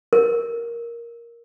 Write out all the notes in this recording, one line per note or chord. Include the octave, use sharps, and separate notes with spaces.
A#4